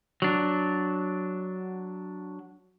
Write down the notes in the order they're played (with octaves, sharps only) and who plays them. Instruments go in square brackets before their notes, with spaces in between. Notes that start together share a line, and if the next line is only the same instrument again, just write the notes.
[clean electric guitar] F#3 D4